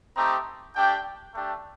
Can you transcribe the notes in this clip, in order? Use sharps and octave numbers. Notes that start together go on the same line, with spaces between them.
A3 C4 D#4 G4 A#5
A3 D4 G4 G5
A3 D4 G4